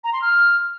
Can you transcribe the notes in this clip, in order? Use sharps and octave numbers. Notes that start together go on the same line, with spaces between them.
A#5
C6
F6